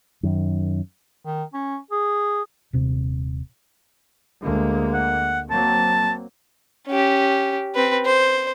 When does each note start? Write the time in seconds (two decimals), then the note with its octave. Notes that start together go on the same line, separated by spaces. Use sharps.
0.23 F#2 D#3
1.26 D#3
1.54 C#4
1.91 G#4
2.73 D#1 C3
4.42 D2 G#3 A#3
4.93 F#5
5.50 F#3 A#3 C4 A5
6.87 C#4 G4
7.75 C4 B4
8.05 C5